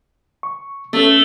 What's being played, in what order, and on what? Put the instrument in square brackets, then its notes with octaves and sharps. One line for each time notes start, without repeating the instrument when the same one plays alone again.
[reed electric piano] C#6
[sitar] A3 [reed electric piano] B3 C#4 A4